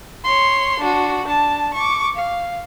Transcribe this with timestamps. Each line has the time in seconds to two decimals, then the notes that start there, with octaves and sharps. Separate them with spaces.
0.24 C#5 C6
0.80 D4 F#4
1.25 D4 A5
1.74 C#6 D6
2.16 F5